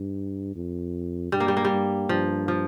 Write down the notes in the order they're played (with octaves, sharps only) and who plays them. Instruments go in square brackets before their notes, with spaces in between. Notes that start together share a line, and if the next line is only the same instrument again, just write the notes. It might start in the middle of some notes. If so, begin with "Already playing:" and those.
Already playing: [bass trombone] G2
F2
[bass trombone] G2 [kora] G3
[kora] A#3
G3
A#3
G3
[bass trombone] G2
[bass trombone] G2 [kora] F3
[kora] F3